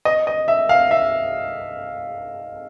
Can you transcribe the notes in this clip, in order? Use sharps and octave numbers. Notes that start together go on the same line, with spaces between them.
D#5
D#5
E5
F5
E5